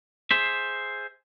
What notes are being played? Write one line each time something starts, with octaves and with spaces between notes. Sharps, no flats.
G#4 C5 E5